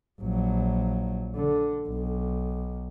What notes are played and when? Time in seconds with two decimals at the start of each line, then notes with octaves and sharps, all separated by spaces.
0.21 A#1 F#3
1.35 D3
1.87 B1